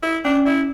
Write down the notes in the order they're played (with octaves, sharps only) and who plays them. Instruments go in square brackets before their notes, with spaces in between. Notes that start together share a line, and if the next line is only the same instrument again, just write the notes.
[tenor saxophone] E4 [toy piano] A4
[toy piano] C#4 [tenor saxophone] D4
[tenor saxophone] E4 [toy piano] D5